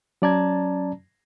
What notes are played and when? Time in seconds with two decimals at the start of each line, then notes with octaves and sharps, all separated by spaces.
0.22 F#3 C#4 D5 A5 A#5 G#6